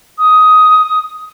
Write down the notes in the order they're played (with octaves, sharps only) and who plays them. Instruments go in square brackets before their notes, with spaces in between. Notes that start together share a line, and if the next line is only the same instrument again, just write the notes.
[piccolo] D#6